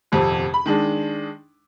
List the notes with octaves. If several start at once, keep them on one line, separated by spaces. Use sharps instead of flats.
D#1 F2 C3
B5
D#3 G#3 D4